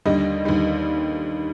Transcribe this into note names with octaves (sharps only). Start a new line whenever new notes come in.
D#2 D3 G3 D#5
D#2 D3 G3